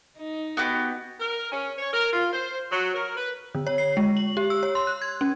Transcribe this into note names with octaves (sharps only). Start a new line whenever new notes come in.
D#4
B3 F#4 G4
A#4
C#4
C#5
A#4
F4
C5
F#3
A#4
B4
D3
C#5
C7
G#3
F#7
G4
E6
C#5
C6
F#6
G#6
C#4